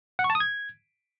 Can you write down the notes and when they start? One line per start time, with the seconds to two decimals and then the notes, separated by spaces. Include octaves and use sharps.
0.19 F#5
0.24 C#6
0.30 A5
0.35 D#6
0.40 G#6